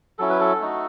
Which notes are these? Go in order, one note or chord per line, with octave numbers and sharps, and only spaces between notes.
F#3 C#4 E4 A4
B4
A4
A3 D#4 F#4